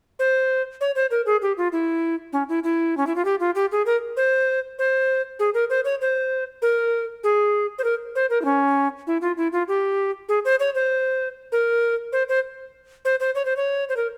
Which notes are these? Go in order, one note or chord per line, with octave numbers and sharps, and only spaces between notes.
C5
C#5
C5
A#4
G#4
G4
F4
E4
C#4
E4
E4
C#4
E4
F4
G4
F4
G4
G#4
A#4
C5
C5
G#4
A#4
C5
C#5
C5
A#4
G#4
C5
A#4
C5
A#4
E4
C#4
E4
F4
E4
F4
G4
G#4
C5
C#5
C5
A#4
C5
C5
C5
C5
C#5
C5
C#5
C5
A#4